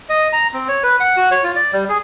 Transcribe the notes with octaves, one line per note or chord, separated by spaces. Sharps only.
D#5
A#5
C4
C#5
B4
F#5
F#4
C#5
F4
D5
G3
G#4